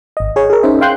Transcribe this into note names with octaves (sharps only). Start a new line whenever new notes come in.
G#1 D#5
G#4 C#5
G#4 A#4
C#4 D#4 C5 E5
F5 G5 C6 F#6 G6